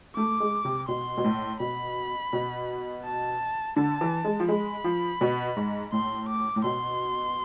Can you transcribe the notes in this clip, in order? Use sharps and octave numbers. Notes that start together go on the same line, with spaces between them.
A3 D6
G#3
C3
B2 C6
B2
A2
B2 B5
B2
A5
D3 A5
E3
G#3
F3
G#3 B5
F3
B2
G#2
A2 C6
D6
A2
B2 C6